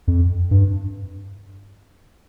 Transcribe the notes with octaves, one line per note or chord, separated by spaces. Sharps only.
F2
G2